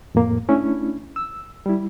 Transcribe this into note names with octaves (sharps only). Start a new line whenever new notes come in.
F2 A2 A#3
A3 C#4 D4 E4
E6
G3 E4